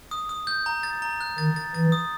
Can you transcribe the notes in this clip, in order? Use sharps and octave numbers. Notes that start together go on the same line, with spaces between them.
D#6
D#6
G6
A#5
A6
A#5
F#6
D#3 A6
A6
E3 A6
D#6